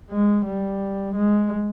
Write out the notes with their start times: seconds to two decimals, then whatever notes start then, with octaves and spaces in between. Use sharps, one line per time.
0.10 G#3
0.46 G3
1.15 G#3